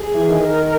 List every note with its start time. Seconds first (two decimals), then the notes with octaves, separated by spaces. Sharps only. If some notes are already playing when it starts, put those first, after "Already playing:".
Already playing: G#4
0.14 E3
0.30 D#3
0.45 A#4